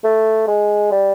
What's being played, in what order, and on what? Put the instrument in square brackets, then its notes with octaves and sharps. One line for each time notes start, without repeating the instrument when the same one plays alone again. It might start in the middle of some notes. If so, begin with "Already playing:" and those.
[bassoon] A3
G#3
G3